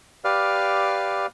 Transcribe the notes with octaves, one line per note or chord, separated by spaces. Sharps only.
G4 B4 D5 F5 F6